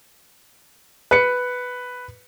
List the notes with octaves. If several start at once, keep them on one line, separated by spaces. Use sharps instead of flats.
B4 C#7